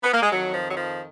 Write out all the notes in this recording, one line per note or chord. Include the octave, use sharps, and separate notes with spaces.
B3
A#3
G#3
F2 D#3 F#3
F3
F#3
F3